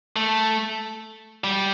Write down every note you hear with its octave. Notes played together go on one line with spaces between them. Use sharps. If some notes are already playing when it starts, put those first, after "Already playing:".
A3
G3